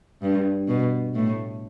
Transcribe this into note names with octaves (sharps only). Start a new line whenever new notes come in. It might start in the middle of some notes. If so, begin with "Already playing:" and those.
G2
B2
A2